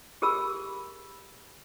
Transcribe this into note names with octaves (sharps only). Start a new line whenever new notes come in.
G4 G#4 A#4 B5 E6